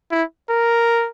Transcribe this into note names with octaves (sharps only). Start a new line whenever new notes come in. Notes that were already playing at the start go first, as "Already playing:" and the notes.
E4
A#4